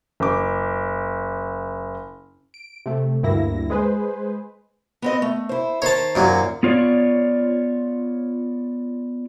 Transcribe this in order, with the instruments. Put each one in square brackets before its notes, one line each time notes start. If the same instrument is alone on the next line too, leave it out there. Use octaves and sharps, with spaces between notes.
[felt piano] F#1 D6
[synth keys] D7
C3 A3
D2 G2 A#3 E4 A#6
G#3 G#4 B4 C5
[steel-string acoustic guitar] B3 C4 D#5
A3
E4 C5
[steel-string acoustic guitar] D#3 C5 A#5 [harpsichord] C#5 A5
[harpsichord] F#2 A#2 F#3
[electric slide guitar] B3 F4 C#5 D5